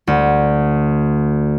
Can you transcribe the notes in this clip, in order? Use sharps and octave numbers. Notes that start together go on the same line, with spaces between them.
D2